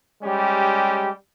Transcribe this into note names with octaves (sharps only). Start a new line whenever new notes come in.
G3 G#3 C#4 G4